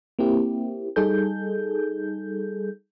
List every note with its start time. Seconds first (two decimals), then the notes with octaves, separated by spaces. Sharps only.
0.19 A#3 C4 E4 G4
0.96 G3 D#4 G#4 A4 G6